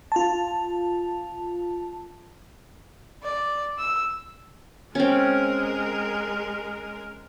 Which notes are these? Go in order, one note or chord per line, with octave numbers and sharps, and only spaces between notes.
F4 A5
D5
E6
G#3 C4 C#4 A#4